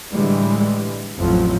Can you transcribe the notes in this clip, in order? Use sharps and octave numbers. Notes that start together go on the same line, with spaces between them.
A2 D3 E3 G3 G#3
A1 F2 A2 F3 F#3